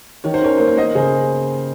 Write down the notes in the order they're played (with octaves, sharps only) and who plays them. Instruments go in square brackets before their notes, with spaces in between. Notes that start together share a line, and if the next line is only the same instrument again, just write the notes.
[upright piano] D#3 C#5
C5
C#4 A#4 C#5
A#3 C5
C#5
A#3 C5 D#5
C#3 G#4 C5